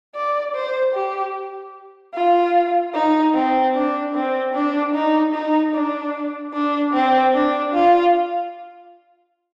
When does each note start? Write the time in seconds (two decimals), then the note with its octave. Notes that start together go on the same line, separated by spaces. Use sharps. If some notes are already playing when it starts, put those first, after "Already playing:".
0.15 D5
0.55 C5
0.95 G4
2.14 F4
2.94 D#4
3.34 C4
3.75 D4
4.14 C4
4.54 D4
4.94 D#4
5.34 D#4
5.74 D4
6.54 D4
6.93 C4
7.34 D4
7.74 F4